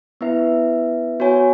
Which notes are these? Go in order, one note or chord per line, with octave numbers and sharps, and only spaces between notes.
B3 E4 B4 E5
B3 F#4 C#5 G#5